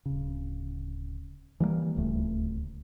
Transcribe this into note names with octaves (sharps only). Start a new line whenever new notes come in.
D1 C#3
E3 G3 G#3 A#3
D1 C#2 A3